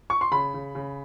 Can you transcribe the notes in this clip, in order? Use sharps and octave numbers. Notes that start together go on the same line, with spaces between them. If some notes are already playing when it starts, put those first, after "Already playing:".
C#6
C6
C#3 B5
C#3
C#3